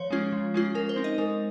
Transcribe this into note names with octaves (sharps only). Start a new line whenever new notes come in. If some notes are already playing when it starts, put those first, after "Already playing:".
Already playing: F3 C#5
G#3 C#4 F4
F3
G#3 C#4 F4
G#3 A#4
C5
C4 D#4
D#5
G#3 A#4